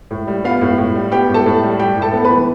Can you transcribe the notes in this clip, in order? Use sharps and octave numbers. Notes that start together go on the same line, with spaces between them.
A2
G3
B3 F4 F5
A2
A2
G3
B3 G4 G5
A2
A4 A5
A2
G3
G3 G4 G5
A2
A4 A5
B3
B4 B5
E3